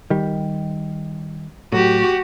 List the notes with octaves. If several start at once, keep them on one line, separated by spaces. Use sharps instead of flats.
D#3 G3
A2 F#3 F#4 G4